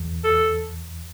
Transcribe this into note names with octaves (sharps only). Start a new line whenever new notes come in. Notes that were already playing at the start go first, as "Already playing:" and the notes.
Already playing: E2
A4